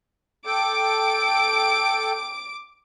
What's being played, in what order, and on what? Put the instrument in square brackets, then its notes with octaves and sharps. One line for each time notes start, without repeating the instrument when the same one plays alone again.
[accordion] A4 G5 [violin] D6 D7